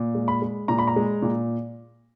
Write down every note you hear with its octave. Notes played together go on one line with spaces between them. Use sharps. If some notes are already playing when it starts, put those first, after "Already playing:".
Already playing: A#2
G#3
B5
G#3
A#2 A#5
B5
A#5
G#3
A#2